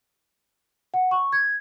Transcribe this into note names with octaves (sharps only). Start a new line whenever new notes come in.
F#5
C#6
G#6